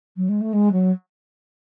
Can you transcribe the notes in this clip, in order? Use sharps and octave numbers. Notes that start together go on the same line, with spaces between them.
F#3
G#3
A3
G#3
F#3